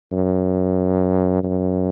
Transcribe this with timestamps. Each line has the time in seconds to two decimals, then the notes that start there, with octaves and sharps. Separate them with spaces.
0.12 F#2
1.44 F#2